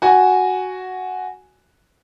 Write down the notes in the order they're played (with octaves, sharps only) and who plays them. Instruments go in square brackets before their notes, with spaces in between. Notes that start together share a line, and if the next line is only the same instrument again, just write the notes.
[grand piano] F#4 G#5